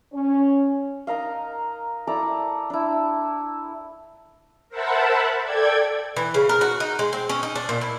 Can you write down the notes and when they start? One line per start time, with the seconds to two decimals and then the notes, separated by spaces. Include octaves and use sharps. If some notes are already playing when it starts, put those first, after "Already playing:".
0.12 C#4
1.07 D#4 A#4 D#5 F5
2.07 E4 A4 D5 A#5
2.70 D4 E4
4.69 A#4 C5 E5 F#5 A5 B5
5.42 A4 D5 G5 G#6
6.17 E3
6.34 C#3
6.49 A#4
6.61 F#4
6.80 D#4
6.99 G#3
7.13 C4
7.29 C#4
7.43 D#4
7.55 D4
7.69 A#2
7.81 E4